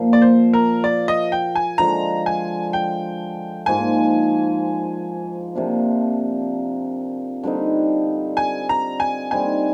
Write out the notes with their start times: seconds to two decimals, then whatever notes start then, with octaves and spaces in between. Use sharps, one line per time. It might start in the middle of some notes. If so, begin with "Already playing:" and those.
Already playing: A#2 F3 A#3
0.13 D5
0.22 C5
0.53 A#4
0.84 D5
1.08 D#5
1.32 G5
1.55 G#5
1.78 D3 F3 G#3 A#5
2.26 G#5
2.73 G5
3.66 G#2 F3 A#3 G#5
5.55 C3 F3 A#3 D4
7.43 D3 G3 C4 D#4
8.37 G#5
8.69 A#5
9.00 G#5
9.31 D3 G3 C4 D#4 G#5